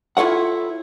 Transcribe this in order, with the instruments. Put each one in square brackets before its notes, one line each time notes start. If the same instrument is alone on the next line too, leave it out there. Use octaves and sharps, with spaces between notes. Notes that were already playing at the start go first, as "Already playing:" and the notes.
[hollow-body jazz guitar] E4 F4 A4 C#5 F#5